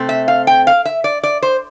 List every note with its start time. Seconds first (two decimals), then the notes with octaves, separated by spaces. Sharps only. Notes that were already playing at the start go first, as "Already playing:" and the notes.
Already playing: C3 A3 C4
0.09 E5
0.28 F5
0.47 G5
0.67 F5
0.85 E5
1.04 D5
1.23 D5
1.42 C5